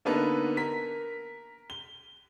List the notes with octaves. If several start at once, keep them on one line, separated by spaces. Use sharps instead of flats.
D3 A#3 B3 D#4 A4 B4
A#4 B6
G7